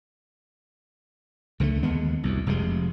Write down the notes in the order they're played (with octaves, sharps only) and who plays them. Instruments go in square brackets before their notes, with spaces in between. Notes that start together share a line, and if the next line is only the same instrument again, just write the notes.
[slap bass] C#2 D3 D#3 A3
D#2 G#3 B3
C2 F#2
F1 F2 C3 G#3